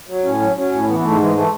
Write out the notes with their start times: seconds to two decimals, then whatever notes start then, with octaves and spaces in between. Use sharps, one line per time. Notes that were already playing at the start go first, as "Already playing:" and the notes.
0.09 F#3
0.24 A2 C#4
0.41 F#3
0.56 F#3 C#4
0.72 A2
0.87 E3 B3
0.99 B3
1.03 G#2 A3
1.20 E3 G#3
1.35 E3 A3